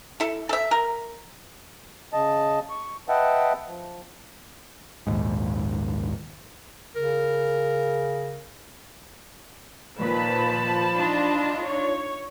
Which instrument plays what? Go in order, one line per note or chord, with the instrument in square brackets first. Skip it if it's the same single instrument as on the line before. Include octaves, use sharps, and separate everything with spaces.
[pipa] E4 A4
A4 E5
A#4
[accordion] C#3 D#5 A5
C#6
B4 D#5 E5 F#5 G5 A5
F3
[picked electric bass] A#1 D#2 G#2
[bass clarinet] C#3 [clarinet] A#4
[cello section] A#2 D#3 B4 [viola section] F3 A5 B5
[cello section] D4 D#4 F4
[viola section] C#5